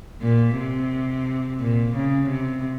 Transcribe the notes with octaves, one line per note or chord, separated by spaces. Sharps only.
A#2
C3
A#2
C#3
C3